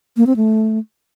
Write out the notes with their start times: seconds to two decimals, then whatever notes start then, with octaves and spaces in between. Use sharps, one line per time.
0.17 A#3
0.27 C4
0.36 A3